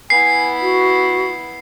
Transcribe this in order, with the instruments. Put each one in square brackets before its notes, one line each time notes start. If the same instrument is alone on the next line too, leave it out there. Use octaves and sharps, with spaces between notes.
[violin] B3 E4 [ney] G#5 [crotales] C7
[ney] F#4